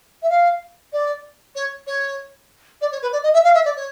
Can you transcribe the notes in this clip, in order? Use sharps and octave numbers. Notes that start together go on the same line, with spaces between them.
E5
F5
D5
C#5
C#5
D5
C#5
B4
D5
D#5
E5
F5
E5
D5
C#5